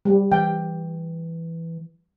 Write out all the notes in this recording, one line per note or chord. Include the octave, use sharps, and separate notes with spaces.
G3
E3 G5